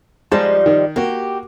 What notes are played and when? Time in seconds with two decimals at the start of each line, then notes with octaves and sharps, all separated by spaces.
0.32 F3 G3 G#3 D#4 C5 A5
0.66 D#3
0.96 A#3 F#4 G4